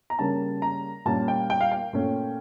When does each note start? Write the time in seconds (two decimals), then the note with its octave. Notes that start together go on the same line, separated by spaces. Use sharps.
0.10 A#5
0.19 C#3 G3 A#3 C#4 A5
0.62 A#5
1.06 A#2 G3 C#4 A5
1.28 G5
1.50 G5
1.61 F5
1.72 G5
1.93 A#2 A3 C#4